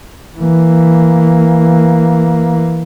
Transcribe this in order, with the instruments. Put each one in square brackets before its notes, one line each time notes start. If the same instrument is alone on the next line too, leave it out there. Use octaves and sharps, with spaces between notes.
[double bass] E3 A#3